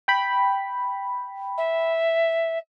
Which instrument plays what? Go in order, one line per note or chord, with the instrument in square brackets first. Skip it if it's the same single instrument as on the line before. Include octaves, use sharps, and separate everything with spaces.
[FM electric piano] G5 B5
[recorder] E5